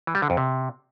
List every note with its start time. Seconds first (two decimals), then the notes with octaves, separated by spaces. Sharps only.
0.07 E3
0.15 G3
0.22 D3
0.30 F2
0.37 C3